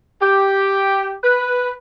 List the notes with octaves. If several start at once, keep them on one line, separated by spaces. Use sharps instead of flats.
G4
B4